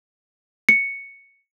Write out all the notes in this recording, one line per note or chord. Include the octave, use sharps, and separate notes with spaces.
C#7